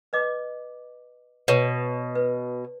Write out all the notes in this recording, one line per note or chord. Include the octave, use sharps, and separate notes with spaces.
B4 D#5 D6
B2 B4 C#5
B4